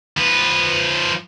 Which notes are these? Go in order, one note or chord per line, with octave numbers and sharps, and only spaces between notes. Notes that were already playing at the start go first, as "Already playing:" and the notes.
F3 B4